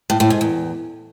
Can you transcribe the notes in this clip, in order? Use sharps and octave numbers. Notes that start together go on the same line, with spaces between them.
A2
A2
G#2
E2